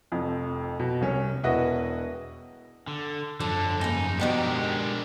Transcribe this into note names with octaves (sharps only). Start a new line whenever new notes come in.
F1 F2
B2
C2 C#4
E1 E4 F#4 B4 D#5
D3
F#2 D3 F3 A4
C#3 A#3 D#4
G#2 B2 D#3 G#3 D4 G4 A#4